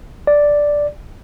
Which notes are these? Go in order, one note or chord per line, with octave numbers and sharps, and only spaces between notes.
D5